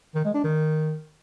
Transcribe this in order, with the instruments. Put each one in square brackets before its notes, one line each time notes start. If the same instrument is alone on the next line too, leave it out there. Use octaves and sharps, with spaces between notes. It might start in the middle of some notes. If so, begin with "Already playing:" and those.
[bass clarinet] D#3
G#3
D4
D#3